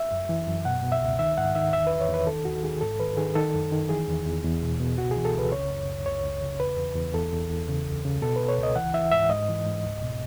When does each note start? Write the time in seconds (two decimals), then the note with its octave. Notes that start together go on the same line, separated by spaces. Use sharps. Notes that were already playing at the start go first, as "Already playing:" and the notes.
Already playing: E5
0.11 F#2
0.29 E3
0.47 F#2
0.65 B2 F#5
0.83 B2
0.92 E5
1.01 C#2
1.19 D#3 E5
1.37 G#2 F#5
1.55 D#3 E5
1.73 E2 E5
1.87 E2 B4
2.01 C#5
2.09 E2 B4
2.27 D#3 A4
2.45 D#2 F#4
2.64 D#3 G#4
2.81 G#2 A4
3.00 D#3 B4
3.17 D#3 G#4
3.35 D#3 A4
3.54 F#2
3.72 D#3
3.89 E3 G#4
4.08 E2
4.25 E2
4.44 E2
4.62 B2
4.80 B2
4.98 C#2 F#4
5.11 G#4
5.16 E3
5.25 A4
5.34 C#2 B4
5.51 C#3 C#5
5.70 F#2
5.88 F#2
6.06 C#2 C#5
6.24 C#2
6.42 C#3
6.59 E2 B4
6.77 E2
6.96 E2
7.14 E2 A4
7.32 E2
7.50 E2
7.69 C#3
7.86 C#2
8.05 C#3
8.22 B2 A4
8.36 B2 B4
8.49 C#5
8.58 C#2
8.63 D#5
8.76 E3 F#5
8.94 E3 E5
9.12 G#2 E5
9.30 G#2 D#5
9.49 E3
9.66 G#2
9.84 C#2
10.02 B2